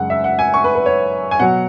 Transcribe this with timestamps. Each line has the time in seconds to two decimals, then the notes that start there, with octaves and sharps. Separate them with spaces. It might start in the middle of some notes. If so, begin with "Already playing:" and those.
Already playing: F#2 C#3 G#3 F#5
0.10 E5
0.24 F#5
0.39 G#5
0.54 C#6
0.64 B4
0.75 B4
0.86 C#5
1.31 G#5
1.39 B2 F#3 F#5